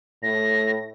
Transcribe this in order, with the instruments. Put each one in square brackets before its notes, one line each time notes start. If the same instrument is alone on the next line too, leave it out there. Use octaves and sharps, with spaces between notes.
[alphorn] A2 [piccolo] A#6